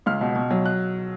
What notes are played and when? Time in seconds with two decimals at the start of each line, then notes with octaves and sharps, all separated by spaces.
0.06 C#2 F6
0.21 B2
0.35 B2
0.51 F#3
0.66 F#6